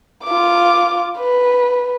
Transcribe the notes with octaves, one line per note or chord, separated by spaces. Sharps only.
F4 D6
B4